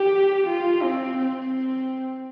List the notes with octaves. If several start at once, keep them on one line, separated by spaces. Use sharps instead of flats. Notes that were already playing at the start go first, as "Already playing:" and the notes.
Already playing: G4
F4
C4
C4